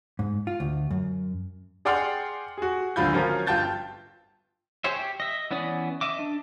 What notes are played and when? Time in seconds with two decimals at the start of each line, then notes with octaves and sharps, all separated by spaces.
0.19 G#2
0.47 F4
0.60 D2
0.91 F#2
1.85 G#4 D5 F#5 G5 C6 F6
2.58 F#4 G#4
2.96 D1 G#1 D3 F4 B5 G6
3.13 F3 F#3 C#4 F4 A#4 C#5
3.47 G1 F4 G5 A5 G6 A6
4.84 G4 G#4 C5 C#5 E5
4.96 G4
5.20 D#5 E5
5.51 E3 B3 C#4 D5 D#6
6.01 D#5 E5 D6
6.19 D4